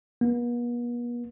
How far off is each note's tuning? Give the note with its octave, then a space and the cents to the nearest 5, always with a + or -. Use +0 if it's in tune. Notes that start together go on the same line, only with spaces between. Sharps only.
B3 -45